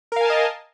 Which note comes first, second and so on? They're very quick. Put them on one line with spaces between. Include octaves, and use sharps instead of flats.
A#4 F5 G#5 A5 D#5